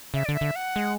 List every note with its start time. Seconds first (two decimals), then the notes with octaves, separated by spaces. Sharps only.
0.14 C#3 E5
0.25 D3 D5
0.35 E5
0.41 D3
0.56 F#5
0.76 G#3